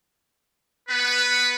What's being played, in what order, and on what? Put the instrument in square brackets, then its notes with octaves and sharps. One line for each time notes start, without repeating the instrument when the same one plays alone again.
[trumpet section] B3 B4